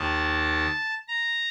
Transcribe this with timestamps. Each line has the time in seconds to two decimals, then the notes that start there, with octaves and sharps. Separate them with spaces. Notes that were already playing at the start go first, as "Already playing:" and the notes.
Already playing: D#2 D#3 A5
1.08 A#5